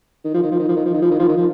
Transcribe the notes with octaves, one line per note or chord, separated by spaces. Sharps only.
D#3
F3
D#3
F3
D#3
F3
D#3
F3
D#3
F3
D#3
F3
D#3
F3